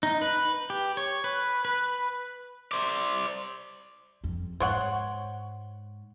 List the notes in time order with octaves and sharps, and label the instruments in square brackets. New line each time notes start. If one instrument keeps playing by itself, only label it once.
[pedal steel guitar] D#4
B4
G4
C#5
B4
B4
[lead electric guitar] C5 D5
[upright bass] F2
[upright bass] G#2 [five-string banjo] C5 C#5 F#5